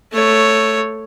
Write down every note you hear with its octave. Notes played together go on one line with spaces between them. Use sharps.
A3 C#5